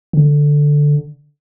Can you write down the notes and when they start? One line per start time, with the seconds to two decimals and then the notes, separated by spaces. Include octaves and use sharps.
0.13 D3